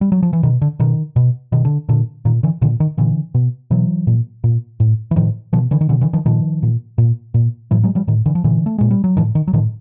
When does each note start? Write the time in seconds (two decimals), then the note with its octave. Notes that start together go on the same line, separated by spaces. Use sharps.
0.01 G3
0.12 F#3
0.23 F3
0.33 E3
0.43 B2 D#3
0.62 D3
0.80 B2 D#3
1.16 B2
1.52 B2 D#3
1.65 D3
1.89 A#2 D3
2.25 A#2 D#3
2.43 D3 E3
2.62 A#2 D3 E3
2.80 D#3
2.98 A#2 D3 E3
3.35 B2
3.71 B2 E3 F#3
4.07 A#2
4.44 A#2
4.80 A2
5.11 E3
5.16 A2 D#3 F3
5.53 B2 D#3 F3
5.71 D3 E3
5.81 D#3
5.89 B2 D3 E3
6.01 D3 E3
6.13 D#3 F3
6.26 A#2 D#3 F3
6.63 A#2
6.98 A#2
7.34 A#2
7.71 A2 E3 F#3
7.84 F#3 G#3
7.95 F3 G3
8.08 A2 D#3
8.26 D3 E3
8.35 F3
8.44 A#2 D3 E3
8.66 A3
8.78 A#2 G#3
8.91 G3
9.04 F#3
9.17 A2 D#3 F3
9.35 D#3
9.48 F#3
9.53 A2 D#3 F3